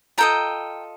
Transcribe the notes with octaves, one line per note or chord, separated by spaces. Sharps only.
F4 A4 D#5 G5 A#5